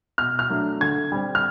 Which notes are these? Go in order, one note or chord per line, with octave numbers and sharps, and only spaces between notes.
B2 F6
F6
F#3 A3 D4
D3 G#6
G3 C4
F6